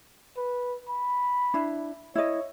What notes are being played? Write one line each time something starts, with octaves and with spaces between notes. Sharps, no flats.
B4
B5
D4 E4
E4 C#5 D#5